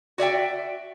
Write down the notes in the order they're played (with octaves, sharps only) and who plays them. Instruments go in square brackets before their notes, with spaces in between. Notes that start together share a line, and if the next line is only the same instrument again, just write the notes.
[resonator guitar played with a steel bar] F#4 D5 E5 G5